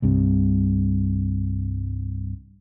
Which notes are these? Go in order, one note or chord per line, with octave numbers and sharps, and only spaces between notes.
C2 G2 C3